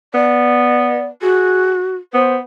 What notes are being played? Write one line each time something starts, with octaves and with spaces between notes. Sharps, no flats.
B3 D5
F#4 G#4
B3 C5